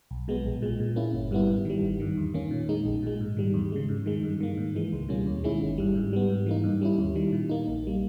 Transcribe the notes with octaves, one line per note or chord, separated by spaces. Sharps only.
B1
B2 G#3 B3
A#1
A#2 G#3
A#2
A#3 C#4 E4
G1
G2 G3 B3 E4
G#2
D#3 G3
G#1
G2 D#3
E2
D#3 A#3 C#4
A#2
G#3 D#4
A#1
A#2 G#3
G#2
D#3 G3
E2
C#3 G#3
G#2
D#3 G#3
G2
D#3 A#3
G#2
E3 G#3
C#2
B2 G3 A#3 C#4
D#2
D#3 G#3 C#4 E4
G1
G2 G3
G#2
G3 B3
G#2
E3 A#3 D#4
G2
G3 C#4 E4
D#2
D#3 G3
A#2
A#3 D#4
A#1
G3 A#3